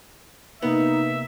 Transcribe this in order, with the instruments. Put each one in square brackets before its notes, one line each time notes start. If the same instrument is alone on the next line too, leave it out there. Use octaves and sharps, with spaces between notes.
[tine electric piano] C3 A#3 [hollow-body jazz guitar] B3 [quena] D#4 [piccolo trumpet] E5